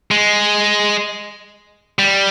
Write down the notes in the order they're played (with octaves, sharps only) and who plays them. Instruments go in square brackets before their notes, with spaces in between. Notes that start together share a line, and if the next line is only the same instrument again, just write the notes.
[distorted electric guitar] G#3
G3